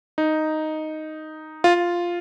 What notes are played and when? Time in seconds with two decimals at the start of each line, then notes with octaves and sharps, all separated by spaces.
0.18 D#4
1.64 F4